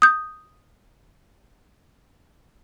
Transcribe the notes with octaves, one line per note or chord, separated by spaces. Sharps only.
D#6 G6